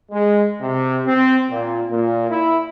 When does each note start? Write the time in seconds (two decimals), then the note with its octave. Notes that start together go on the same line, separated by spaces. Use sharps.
0.11 G#3
0.61 C3
1.05 C4
1.49 A#2
1.89 A#2
2.30 E4